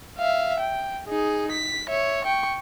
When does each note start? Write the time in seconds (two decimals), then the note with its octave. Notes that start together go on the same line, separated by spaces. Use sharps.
0.18 E5 F5
0.60 G5
1.08 D#4 G#4
1.52 B6
1.89 C#5 E5
2.25 G5 C#6